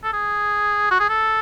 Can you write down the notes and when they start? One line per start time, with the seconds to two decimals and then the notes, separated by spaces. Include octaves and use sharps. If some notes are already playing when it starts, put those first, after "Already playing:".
0.04 A4
0.13 G#4
0.91 F#4
1.00 G#4
1.09 A4